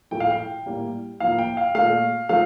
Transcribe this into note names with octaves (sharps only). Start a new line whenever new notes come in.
A2 F3 A3 G5
F5
G5
A2 G3 A#3
A2 F3 A#3 F5
G5
F5
A#2 A3 F5
F3 A3 F5